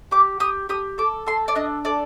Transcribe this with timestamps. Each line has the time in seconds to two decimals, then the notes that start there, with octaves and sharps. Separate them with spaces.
0.11 G4 D6
0.40 G4 D#6
0.69 G4 D#6
0.98 A4 D6
1.27 A4 C6
1.48 D5
1.55 D4 D#5
1.85 A4 D5